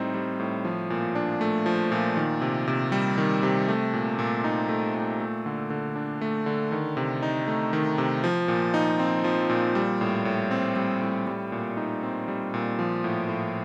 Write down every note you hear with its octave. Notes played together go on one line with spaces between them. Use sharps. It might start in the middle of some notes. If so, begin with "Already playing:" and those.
Already playing: A2 G3 C4 D#4
G3
A2
F3
A#2
D4
A3
F3
A#2
D#3
C3
C3
G3
D#3
C3
A3
A#2
A#2
D#4
A3
A#2
A3
D3
D3
D4
A3
D3
D#3
C3
D#4
A3
D#3
C3
F3
A#2
D#4
C4
F3
A#2
G3
A2
A2
C4
G3
A2
G3
A#2
D#4
C4
G3
A#2
F3
A2
A2